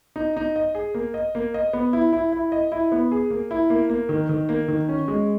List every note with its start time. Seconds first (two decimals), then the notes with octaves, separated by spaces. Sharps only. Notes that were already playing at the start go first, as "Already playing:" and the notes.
0.16 D#4
0.37 D#4
0.56 D#5
0.75 G#4
0.94 A#3
1.14 D#5
1.35 A#3
1.54 D#5
1.73 B3
1.93 E4
2.13 E4
2.32 E4
2.52 D#5
2.72 E4
2.92 B3
3.12 G#4
3.30 A#3
3.51 E4
3.70 A#3
3.90 A#3
4.09 D#3
4.29 D#3
4.49 A#3
4.68 D#3
4.89 C#4
5.08 G#3